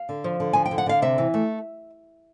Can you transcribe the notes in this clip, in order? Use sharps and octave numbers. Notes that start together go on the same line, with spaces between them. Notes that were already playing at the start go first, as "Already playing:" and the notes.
Already playing: F5
D3
F3
D3
F3 G#5
G5
D3
F#5
D3 F5
C3 E5
E3
A3